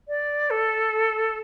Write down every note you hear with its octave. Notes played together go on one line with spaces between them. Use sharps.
D5
A4